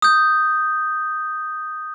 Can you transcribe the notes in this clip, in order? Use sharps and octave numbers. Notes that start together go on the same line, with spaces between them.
D#6 G6